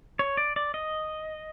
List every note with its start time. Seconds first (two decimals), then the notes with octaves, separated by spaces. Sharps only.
0.19 C#5
0.37 D5
0.56 D5
0.74 D#5